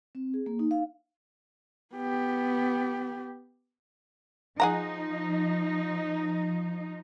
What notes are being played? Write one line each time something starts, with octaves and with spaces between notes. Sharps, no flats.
C4
G#4
A#3
D#4
F5
B3 G4
F3 D#4 G#4 F#5 A#5